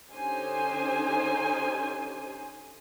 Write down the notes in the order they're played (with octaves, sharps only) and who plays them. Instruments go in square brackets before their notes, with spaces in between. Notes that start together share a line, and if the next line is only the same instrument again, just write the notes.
[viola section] D3 C#4 D#4 G4 C5 G#5